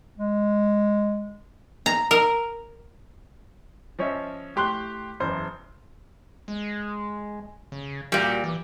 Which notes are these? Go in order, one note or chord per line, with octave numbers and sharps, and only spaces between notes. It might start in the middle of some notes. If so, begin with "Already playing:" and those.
G#3
A#5
A#4
F3 C#4 C#5 D#5 E5
A2 G4 C6 F#6 G7
F#1 E2 C5
G#3
C#3
A#2 G3 F#4
E3